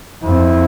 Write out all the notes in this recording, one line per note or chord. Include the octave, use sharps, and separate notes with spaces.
F2 E4